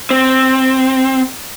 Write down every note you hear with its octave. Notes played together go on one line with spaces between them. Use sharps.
C4